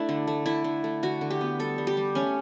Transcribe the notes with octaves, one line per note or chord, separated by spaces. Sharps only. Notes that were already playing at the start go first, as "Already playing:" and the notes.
Already playing: A3 D4 E4
D3
A3
D3 E4
D3
A3
D3 F#4
D3
G4
B3
G3 A4
G3
G4
G3
A3 C#4